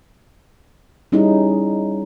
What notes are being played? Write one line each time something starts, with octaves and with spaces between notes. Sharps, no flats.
G3 C#4 D#4 E4 G#4